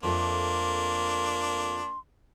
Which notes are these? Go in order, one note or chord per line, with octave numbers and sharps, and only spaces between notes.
F2 F3 A3 A#3 D4 C6